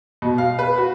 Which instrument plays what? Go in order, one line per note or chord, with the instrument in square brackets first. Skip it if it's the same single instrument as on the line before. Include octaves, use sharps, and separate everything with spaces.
[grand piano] B2
F5
B4
F#4